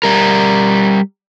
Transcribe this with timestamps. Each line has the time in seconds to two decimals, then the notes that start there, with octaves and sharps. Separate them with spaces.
0.03 G3 A#4